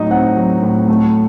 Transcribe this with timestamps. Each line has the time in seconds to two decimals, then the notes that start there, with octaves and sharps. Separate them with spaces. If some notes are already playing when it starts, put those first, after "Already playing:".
Already playing: A2 F#3 D#4 D#5
0.11 C4 F#5
0.37 F#3
0.62 A2
0.89 A3